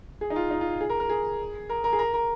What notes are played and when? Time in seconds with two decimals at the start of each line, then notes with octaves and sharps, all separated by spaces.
0.21 G#4
0.30 D#4
0.36 F4
0.51 D#4
0.61 F4
0.81 G#4
0.89 A#4
1.00 A#4
1.09 G#4
1.69 A#4
1.84 A#4
1.93 G#4
1.99 A#4
2.14 A#4